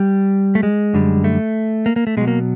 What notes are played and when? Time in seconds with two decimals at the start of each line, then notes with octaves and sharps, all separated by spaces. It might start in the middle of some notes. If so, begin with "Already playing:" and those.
Already playing: G3
0.55 A3
0.63 G#3
0.94 F#2 D3 G3
1.24 A3
1.86 A#3
1.96 A#3
2.07 A3
2.17 B2 F#3 G#3
2.28 A#3